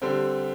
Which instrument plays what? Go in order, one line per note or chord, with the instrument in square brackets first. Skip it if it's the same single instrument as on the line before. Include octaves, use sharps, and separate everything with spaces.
[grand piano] D3 G3 C4